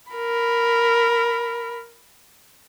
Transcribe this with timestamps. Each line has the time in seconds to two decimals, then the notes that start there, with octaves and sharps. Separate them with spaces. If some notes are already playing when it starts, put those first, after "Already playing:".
0.12 A#4 B5